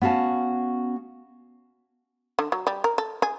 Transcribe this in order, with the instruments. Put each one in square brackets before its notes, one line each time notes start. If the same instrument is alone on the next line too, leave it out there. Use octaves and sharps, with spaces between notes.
[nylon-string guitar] B3 C#4 F#4 F5 A5
[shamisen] D3
F#3
G3
A#4
A4
G#4